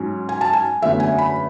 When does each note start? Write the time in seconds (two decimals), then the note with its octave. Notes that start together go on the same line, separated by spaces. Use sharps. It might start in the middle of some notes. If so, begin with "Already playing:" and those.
Already playing: G#2 F#3 C#4
0.29 G#5
0.41 A5
0.53 G#5
0.82 F#1 E2 D3 A3 E5
1.00 G#5
1.18 B5